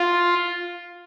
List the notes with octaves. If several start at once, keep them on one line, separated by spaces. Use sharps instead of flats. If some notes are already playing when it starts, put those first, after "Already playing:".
Already playing: F4